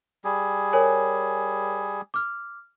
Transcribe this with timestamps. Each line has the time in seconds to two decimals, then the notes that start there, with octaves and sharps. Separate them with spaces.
0.24 G3 G#4
0.73 A#4 C#5 G#5
2.14 D6 F6